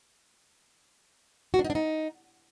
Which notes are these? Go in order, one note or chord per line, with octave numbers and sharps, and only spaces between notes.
F#4
D4
D#4
D4
D#4